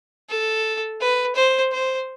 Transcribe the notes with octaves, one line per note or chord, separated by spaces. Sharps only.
A4
B4
C5
C5